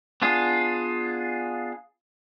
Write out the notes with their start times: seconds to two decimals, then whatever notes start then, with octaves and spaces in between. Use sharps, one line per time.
0.22 B3 D4 F4 G#4